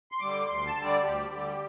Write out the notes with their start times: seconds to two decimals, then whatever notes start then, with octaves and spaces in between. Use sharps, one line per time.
0.12 C6
0.20 D3 G3 D6
0.48 D2 C6
0.67 A5
0.76 D3 G3
0.85 D5
1.03 D2 G4
1.31 D3 G3